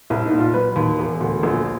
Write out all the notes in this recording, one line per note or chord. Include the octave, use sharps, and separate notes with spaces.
C2 E4
D#4
A#2
F4
F#3 B4
D#2
E1
D2
A#1